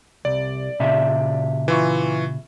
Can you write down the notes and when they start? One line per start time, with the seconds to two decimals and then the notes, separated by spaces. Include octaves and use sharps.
0.25 C2 D5
0.80 A#2 C#3 E5
1.68 E3 F4 C#6